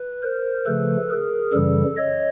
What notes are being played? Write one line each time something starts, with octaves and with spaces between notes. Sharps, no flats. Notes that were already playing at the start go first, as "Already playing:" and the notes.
Already playing: B4
A#4 C5
C#3 F3 A3 A4 B4
G#4 A#4
F#2 C#3 E3 G3 A4
C#5 D#5